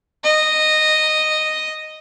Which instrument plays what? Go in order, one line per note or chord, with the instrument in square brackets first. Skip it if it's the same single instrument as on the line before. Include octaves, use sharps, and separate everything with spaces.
[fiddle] D#5